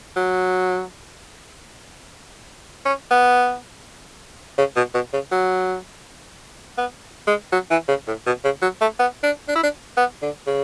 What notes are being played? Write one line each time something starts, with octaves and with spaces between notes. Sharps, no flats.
F#3
C#4
B3
C#3
B2
B2
C#3
F#3
B3
G#3
F#3
E3
C#3
A2
B2
C#3
F#3
A3
B3
D4
D4
E4
D4
B3
D3
C#3